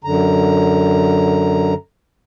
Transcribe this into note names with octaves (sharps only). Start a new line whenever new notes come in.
F#2 D3 A#5